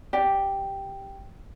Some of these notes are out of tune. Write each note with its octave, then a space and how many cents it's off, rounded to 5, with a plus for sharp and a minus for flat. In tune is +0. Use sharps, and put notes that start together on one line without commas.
G4 +0 D5 +0